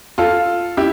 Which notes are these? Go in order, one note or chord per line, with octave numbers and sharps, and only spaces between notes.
F4 A4
E4 G4